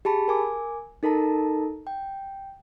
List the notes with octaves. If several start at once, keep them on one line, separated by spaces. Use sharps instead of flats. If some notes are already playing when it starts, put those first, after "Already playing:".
G4 G#4 A5 B5
A#4 G#5 D6
D#4 A4 A#4 A5 A#5
G5